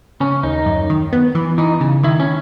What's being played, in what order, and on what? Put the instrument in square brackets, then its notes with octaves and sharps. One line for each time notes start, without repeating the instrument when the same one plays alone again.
[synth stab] C#3 [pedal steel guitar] C#4
[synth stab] D#2 [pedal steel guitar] D#4
[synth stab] F#2
D#3
B3
E3
[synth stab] E3 [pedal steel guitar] D#4
[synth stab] C#3
[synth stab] D#3 [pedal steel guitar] E4
[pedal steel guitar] C#4